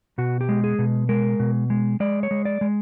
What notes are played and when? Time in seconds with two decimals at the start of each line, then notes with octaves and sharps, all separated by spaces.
0.18 B2 F#4
0.41 G4
0.49 G#3
0.64 G#4
0.79 B2
1.09 G#3 A#4
1.40 B2
1.70 G#3
2.00 G#3 D5
2.23 C#5
2.31 G#3
2.45 D5
2.61 G#3